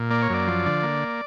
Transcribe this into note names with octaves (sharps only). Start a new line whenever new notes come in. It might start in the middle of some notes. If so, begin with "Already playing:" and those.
Already playing: A#2
A#3 D5
C#5
F#2 D5
F3
D3
A#3